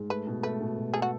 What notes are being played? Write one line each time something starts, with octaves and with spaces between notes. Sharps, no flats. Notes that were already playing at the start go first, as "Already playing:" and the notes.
Already playing: G#2
A3 B4
B2
A3 B4
B2
B2
G#4 A4
F#4